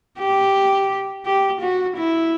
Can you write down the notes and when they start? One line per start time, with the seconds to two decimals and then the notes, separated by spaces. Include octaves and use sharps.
0.19 G4
1.25 G4
1.61 F#4
1.97 E4